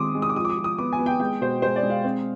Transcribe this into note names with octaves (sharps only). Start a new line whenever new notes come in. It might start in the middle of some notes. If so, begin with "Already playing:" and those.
Already playing: D#3 G#3 C4 C6 D6 D#6
G#3
D#6
D6
F3 D#6
D6
D#6
F3
D#6
B3 D6
G#5
B3
G5
G#3 G5
B2 C5
G#3 C5
D5
G#3
F5
C4